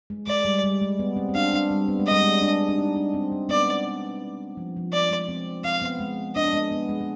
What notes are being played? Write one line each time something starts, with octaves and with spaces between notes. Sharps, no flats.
G#3
G#3 D5
G3
G3
G#3
B3
C4
C4
D4 F5
D4
G3
B3
G#3
G3 D#5
G#3
D4
D4
D#4
D4
C4
G#3
B3 D5
F3
F3
D5
G#3
C4
C4 F5
B3
G#3
D4 D#5
B3
G#3
B3
G#3
G#3